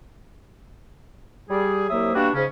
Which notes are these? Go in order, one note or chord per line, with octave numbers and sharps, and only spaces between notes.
G3 G#4
C2 C3 F#3 A#3 E5 D#6
B2 G3 A#3 D4 F#4
G#2 C#3 C#4